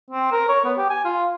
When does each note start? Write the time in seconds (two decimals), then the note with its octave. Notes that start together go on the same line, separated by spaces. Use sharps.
0.10 C4
0.32 A#4
0.49 C#5
0.65 B3
0.78 G4
0.90 G#5
1.05 F4